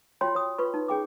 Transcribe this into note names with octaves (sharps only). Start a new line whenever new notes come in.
F4 F#4 C#5 G5 C6
F4 C#5 D#6
F4 B4 C#6
D#4
C#4 G#4 G5 D6